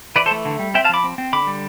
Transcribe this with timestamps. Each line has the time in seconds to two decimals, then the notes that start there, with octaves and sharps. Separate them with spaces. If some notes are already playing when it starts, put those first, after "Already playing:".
0.16 E3 B4 D5
0.26 A4 C5
0.31 A3
0.45 D3
0.59 G3
0.74 C4 E5 G5
0.85 F5 A5
0.89 F3 B5 D6
1.04 C4
1.18 C4
1.33 D3 B5 D6
1.47 G3